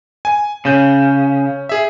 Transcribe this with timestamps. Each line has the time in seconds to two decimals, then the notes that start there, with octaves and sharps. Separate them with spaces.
0.25 G#5
0.65 C#3 C#4 G6
1.69 G#4 E5